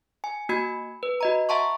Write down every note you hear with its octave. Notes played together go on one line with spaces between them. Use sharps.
G#5
A#3 F#4 G#5 B5 G#6
B4
F#4 D#5 A#5
E5 F#5 A5 A#5 C6 C#6